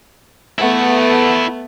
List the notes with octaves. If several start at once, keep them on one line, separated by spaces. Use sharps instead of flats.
A3 B3 E4 F#5